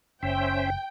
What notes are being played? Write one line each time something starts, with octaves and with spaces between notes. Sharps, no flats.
F#1 C#4 C5 E5 G5